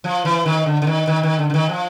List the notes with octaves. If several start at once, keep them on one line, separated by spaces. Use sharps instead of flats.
F3
E3
D#3
D3
D3
D#3
D#3
D#3
D3
D3
D#3
F3